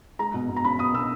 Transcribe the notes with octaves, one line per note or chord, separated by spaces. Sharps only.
G#3 A#5
B2
B2
A#5
C#4 B5
B2 D#6
B2 E6